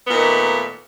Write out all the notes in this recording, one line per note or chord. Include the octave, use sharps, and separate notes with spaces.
A#2 D#3 A3 B3